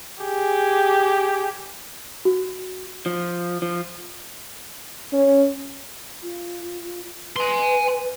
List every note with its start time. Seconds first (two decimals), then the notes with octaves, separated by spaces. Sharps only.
0.23 G4 G#4
2.25 F#4
3.06 F3
3.62 F3
5.13 C#4
6.23 F4
7.36 B4 G#5 C6